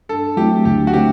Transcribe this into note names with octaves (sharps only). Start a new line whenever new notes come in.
G2 A4
F#3 A3 C4 E4 G4
D2 G4
F#4
D3 A3 C4 E4 G4